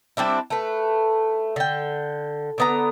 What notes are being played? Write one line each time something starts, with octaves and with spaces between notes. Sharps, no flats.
G3 C4 D4 E4
A3 B4
D3 G5
D3 B3 A#5